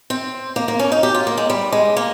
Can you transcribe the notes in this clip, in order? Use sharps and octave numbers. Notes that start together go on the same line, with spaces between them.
C4
A#3
A#3
C#4
D#4
G4
F4
A#3
G#3
G3
G#3
A#3